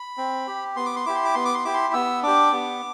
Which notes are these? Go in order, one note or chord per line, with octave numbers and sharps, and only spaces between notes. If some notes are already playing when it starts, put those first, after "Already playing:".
Already playing: B5
C4
G4
B3 C6
D6
C6
E4 G4 D6
C6
D6
B3 C6
D6
C6
E4 G4 D6
C6
B3 E6
D4 G4 D6
B3